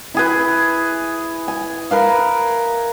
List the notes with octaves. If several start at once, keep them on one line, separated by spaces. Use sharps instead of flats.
E4 G#4 B4
G#5
A#4 B4 F5